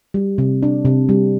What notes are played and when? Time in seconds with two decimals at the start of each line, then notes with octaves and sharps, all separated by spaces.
0.14 G3
0.38 C3
0.63 D4
0.85 C3
1.09 G3